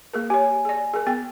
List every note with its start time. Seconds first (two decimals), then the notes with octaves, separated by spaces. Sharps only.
0.13 A#3 G#4 A#4
0.30 G4 C#5 G#5
0.65 G#4 D5
0.94 G#4 A#4
1.07 B3 G#4 G5